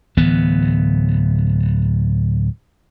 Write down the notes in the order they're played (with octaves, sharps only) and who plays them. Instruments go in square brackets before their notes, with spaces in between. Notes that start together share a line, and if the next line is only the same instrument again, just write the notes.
[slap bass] D1 E3 B3